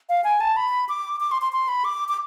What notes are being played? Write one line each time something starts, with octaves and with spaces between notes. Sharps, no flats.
F5
G#5
A5
B5
D6
D6
C6
C6
C6
B5
D6
D6